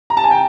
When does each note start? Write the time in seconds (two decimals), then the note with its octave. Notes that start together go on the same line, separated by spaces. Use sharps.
0.10 A#5
0.17 A5
0.24 G#5
0.31 G5